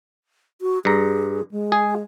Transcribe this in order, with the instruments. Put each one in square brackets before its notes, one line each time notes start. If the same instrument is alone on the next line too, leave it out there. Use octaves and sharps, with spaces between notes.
[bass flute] F#4
[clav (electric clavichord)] G2 A#5 [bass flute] G#4
[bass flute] G#3
[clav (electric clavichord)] G#4